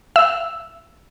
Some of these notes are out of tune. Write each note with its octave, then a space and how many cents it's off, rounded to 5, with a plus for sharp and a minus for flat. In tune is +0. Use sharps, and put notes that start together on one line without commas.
E5 +35 E6 +0